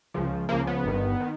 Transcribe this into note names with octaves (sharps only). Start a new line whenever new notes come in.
C#2 C#3 F3
C#2 C#3 F3 A#3
B3
G1 G2 D#3
D#3